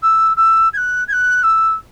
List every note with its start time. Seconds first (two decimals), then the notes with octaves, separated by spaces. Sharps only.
0.02 E6
0.37 E6
0.73 G#6
0.77 F#6
1.08 G#6
1.12 F#6
1.43 E6